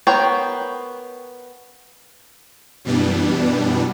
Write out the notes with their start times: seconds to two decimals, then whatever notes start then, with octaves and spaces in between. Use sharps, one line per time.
0.07 B3 A#4 C5 C#5 G5
2.85 F#2 B2 E3 G3 B3 D4